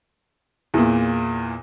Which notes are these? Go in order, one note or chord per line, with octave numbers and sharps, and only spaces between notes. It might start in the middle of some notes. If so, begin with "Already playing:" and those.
E2 A#2